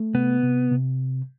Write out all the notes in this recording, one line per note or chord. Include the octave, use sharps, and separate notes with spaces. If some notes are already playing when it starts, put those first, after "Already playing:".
Already playing: A3
C3 B3
C3
C3